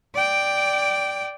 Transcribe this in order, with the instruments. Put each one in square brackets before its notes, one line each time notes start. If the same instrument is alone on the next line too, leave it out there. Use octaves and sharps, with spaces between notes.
[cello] D5 G5